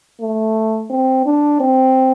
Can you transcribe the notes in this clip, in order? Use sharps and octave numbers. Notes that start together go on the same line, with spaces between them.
A3
C4
D4
C4